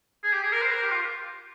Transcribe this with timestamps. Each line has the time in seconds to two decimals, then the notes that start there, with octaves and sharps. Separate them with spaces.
0.24 G#4
0.33 G4
0.43 G#4
0.53 A#4
0.62 C5
0.72 A#4
0.82 G4
0.91 F4